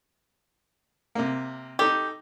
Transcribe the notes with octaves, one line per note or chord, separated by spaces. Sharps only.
C3 A#3
D#4 G4 A4